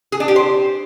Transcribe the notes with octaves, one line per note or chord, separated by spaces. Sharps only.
G#4
D4
G4
C5